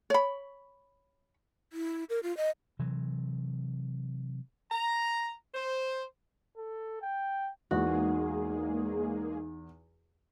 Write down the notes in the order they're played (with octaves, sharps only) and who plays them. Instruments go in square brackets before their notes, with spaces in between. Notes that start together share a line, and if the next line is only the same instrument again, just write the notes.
[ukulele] C#5 B5
[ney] E4
A#4
F4
D#5
[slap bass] C3 E3 F#3
[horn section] A#5
C5
[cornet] A4
G5
[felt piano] E2 [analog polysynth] G#3 A#3 G#4 [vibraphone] D#4 [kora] F#4